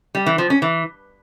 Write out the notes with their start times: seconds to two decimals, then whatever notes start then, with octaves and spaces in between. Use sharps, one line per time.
0.15 G3
0.26 E3
0.38 F3
0.50 C#4
0.62 E3